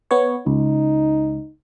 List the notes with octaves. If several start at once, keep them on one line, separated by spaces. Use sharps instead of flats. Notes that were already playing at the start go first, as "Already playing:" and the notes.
B3 C#5
C#2 D#4